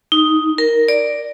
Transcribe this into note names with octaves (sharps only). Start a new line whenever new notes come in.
D#4
A#4
D5